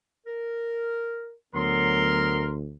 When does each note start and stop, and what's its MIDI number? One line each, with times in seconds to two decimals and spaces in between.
0.27 1.33 70
1.55 2.76 38
1.55 2.48 54
1.55 2.48 59
1.55 2.49 70
1.55 2.49 84